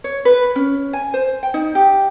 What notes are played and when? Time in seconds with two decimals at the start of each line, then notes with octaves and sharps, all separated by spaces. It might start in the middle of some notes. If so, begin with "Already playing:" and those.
0.04 C#5
0.25 B4
0.56 C#4
0.93 G#5
1.14 C5
1.43 G5
1.54 D#4
1.75 G4